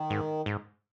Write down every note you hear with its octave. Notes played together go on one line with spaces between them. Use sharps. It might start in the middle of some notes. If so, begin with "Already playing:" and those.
Already playing: D#3
G#2
G#2